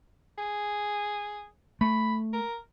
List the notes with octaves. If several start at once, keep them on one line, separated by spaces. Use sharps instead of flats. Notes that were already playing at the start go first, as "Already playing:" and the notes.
G#4
A3 B5
A#4